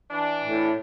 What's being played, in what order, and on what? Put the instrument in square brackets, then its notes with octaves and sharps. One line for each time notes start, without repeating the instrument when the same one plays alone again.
[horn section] E3 D4
[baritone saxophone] A2